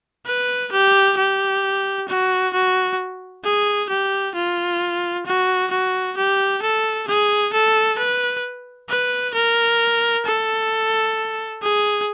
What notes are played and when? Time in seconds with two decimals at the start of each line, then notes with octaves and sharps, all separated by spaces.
0.26 B4
0.72 G4
1.17 G4
2.08 F#4
2.53 F#4
3.44 G#4
3.90 G4
4.34 F4
5.26 F#4
5.71 F#4
6.16 G4
6.62 A4
7.07 G#4
7.53 A4
7.98 B4
8.89 B4
9.34 A#4
10.25 A4
11.62 G#4